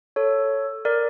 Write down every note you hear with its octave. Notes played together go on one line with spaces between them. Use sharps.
A4 C#5
A#4 D5